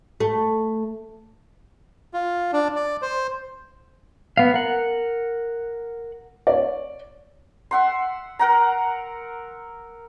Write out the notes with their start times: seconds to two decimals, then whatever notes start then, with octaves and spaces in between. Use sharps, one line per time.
0.20 A3
2.13 F4
2.53 D4
2.76 D5
3.02 C5
4.37 B3 F5
4.54 A#4 F#5
6.47 C#5 D5
7.71 E5 F#5 C6
8.39 A#4 F#5 A#5